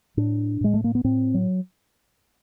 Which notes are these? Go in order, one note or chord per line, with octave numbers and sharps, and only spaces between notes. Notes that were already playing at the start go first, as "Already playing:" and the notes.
A2 D4
A2 G#3
A3
A#3
B3
A2 C4
F#3